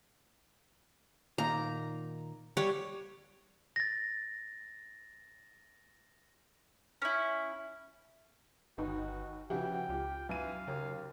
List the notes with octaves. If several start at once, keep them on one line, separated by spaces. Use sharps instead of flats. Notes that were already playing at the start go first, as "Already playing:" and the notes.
A#2 D#3 A#3 A#5
G3 C#5
A6 A#6
C#4 E4
G1 D#2 D#4 F#4 B4
C#3 E3 F3 F#4 G4 G5
C#2 F4 G4
F#2 E3 F5 D#7
D#2 C#3